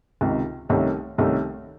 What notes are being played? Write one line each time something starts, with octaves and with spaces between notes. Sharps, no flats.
C#2 C3 D#3
C2 C3 D#3 A3 C#4
C2 C3 D#3 A3 C#4